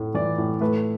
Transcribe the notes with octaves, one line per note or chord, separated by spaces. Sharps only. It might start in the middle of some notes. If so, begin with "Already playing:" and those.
Already playing: A2 A3
E3 D5
A2
A3 B4